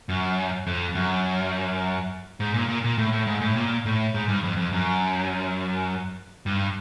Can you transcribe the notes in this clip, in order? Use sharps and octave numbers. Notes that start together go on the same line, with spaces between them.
F#2
F2
F#2
G#2
A#2
A#2
A#2
A2
A2
G#2
A2
A#2
A2
G#2
G2
F2
F2
F#2
G2